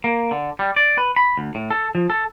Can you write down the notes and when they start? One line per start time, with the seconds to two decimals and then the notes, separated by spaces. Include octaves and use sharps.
0.04 A#3
0.31 D3
0.59 G3
0.76 D5
0.98 B4
1.16 B5
1.38 D2
1.55 A2
1.71 A4
1.95 F3
2.10 A4